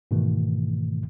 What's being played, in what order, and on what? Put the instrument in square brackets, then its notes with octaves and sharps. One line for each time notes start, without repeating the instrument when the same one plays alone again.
[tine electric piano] G#2 B2 D#3 E3 A3